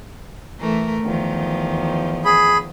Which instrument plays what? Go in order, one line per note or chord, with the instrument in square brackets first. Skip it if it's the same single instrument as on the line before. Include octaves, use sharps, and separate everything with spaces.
[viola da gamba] E3 A3 A#4
E2 D#3 F3
[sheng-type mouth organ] G#4 B5